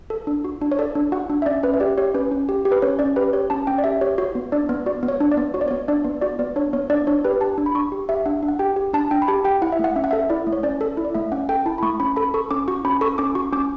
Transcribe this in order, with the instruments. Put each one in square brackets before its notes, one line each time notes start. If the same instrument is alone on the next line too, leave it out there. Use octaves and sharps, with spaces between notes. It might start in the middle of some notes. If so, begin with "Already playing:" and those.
[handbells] A4
D4
F#4
D4
C#5
A4 D5
D4
F#4 F#5
D4
E5
C#4 D5
C#4 B4
E5
G4 D5
G4 C#5
C#4 B4
C#4
G4
G4
B4
C#4 C#5
C#4 D5
G4 B4
G4 C#5
C#4 A5
C#4 G5
D5
G4 E5
G4 C#5
F#4 C#5
B3
D4 D5
B3
F#4 D5
B3
C#5
D4
D5
B3
F#4 C#5
D5
B3 C#5
D4 D5
B3
F#4 D5
B3 D5
D4 C#5
B3 C#5
D4 D5
D4 C#5
G4 B4
G4 A5
D4
B5
D4 C#6
G4
G4 E5
D4 F#5
D4
F#5
G4 G5
G4
D4 A5
D4 G5
B5
G4 A5
G4 G5
E4 F#5
E5
A3 F#5
C#4 E5
F#5
A4 E5
E4 D5
A3
C#5
C#4 D5
A4
E4
D5
A3 E5
C#4 F#5
A4 G5
E4 A5
B5
A3 C#6
C#4 B5
A4 B5
A4 C#6
C#4 D6
F#4 C#6
C#4 B5
A4 C#6
C#4 D6
F#4 C#6
C#4 D6